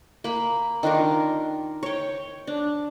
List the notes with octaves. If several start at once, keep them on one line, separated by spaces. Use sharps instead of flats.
A#3 B5
D#3 D4 F4 A#4
C#5 G5
D4